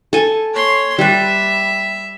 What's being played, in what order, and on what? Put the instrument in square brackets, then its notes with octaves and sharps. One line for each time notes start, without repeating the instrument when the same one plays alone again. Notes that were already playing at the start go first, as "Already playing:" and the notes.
[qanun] A4 G#5
[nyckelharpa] C#5 C6
[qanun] G3 B4 [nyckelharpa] E5